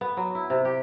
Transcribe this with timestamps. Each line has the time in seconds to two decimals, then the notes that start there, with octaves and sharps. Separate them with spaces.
0.01 B3
0.17 F#3
0.35 E4
0.50 C3
0.65 G4